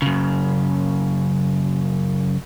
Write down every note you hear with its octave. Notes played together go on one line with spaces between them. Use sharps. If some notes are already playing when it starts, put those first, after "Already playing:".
F#2 C#3